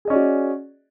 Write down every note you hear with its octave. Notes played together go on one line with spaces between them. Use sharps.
C#4 F#4 G#4 D5 D#5